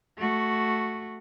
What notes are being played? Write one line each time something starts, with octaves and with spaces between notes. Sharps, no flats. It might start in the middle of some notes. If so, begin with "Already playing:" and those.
A3 F#4